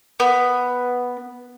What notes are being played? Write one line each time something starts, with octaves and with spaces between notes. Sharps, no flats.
B3